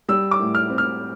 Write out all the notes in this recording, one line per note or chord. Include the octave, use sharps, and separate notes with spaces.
G3 E6
D6
A2
F6
C4
F6